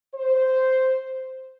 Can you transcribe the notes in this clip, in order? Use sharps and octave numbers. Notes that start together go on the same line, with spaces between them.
C5